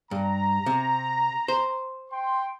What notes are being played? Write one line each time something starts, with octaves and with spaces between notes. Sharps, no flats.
G2 A#5
C3
C5
G5 C6